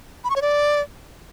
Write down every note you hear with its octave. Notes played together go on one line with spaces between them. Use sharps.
B5
C#6
C#5
D5